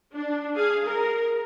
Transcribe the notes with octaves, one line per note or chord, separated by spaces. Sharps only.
D4
G#4 F5
A#4